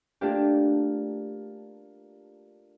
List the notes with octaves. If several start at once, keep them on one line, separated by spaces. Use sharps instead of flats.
A3 A#3 D4 F4 G4